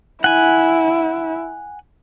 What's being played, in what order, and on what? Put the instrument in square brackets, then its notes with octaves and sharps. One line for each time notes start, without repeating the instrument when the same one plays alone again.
[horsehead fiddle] E4 [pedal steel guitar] F#5 G#5